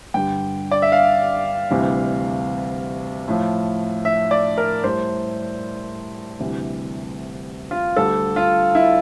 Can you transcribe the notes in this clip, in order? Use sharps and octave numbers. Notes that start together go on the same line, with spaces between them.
G2 D3 G3 G5
D5
E5
F5
D2 C3 E3 G3
A2 F3
E5
D5
A#4
A2 G3 C5
D2 C3 E3 G3
F4
D2 D3 G3 A4
F4
E4